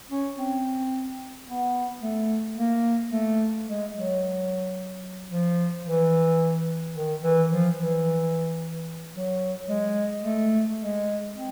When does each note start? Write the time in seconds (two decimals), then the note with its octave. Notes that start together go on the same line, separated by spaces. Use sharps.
0.11 C#4
0.38 C4
1.48 B3
2.02 A3
2.58 A#3
3.12 A3
3.67 G#3
3.94 F#3
5.30 F3
5.85 E3
6.95 D#3
7.23 E3
7.50 F3
7.78 E3
9.15 F#3
9.70 G#3
10.24 A3
10.79 G#3
11.34 C4